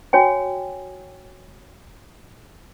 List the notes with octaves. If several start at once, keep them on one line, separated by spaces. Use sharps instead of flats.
F#4 C#5 G5 G#5